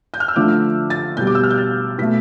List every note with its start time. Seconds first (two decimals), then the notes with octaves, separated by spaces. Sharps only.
0.14 G6
0.20 F6
0.28 E6
0.36 D3 F3 A3 D6
0.90 A6
1.17 B2 G3 G6
1.27 D6
1.35 E6
1.43 F6
1.51 G6
1.58 A6
1.98 B2 A3 B6